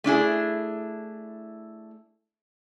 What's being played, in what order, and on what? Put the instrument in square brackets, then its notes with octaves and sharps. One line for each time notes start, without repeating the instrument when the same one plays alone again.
[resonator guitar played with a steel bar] A3 D4 E4 G#4